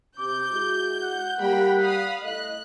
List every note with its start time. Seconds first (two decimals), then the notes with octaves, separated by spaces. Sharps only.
0.19 C3 D6 G6
0.51 G#3 E4 F#4
1.03 F#5
1.40 G3 A#3 G5 B5
1.79 F5 B5 D#6
2.23 A3 E4 D#5 F#6